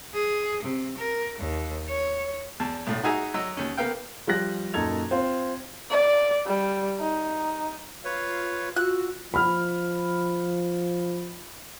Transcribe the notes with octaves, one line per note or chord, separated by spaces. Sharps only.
G#4
C3
A#4
D#2
C#5
E2 A5
B1 A2
D#4 F#4 G#4 E5 G#5 A#5
F#3 D#5 E6
D#2 C#4
A#3 B3 F5 G5
F3 G3 G4 F#6 A#6
F#2 A#2 D#4 A4 G#6 F7
C4 F4 C6
D5
G3
D#4
F4 B4 C#5
F4 F#4 E6 F#6
F3 B5 F6